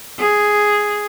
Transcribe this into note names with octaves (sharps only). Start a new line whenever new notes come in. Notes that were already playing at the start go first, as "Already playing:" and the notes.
G#4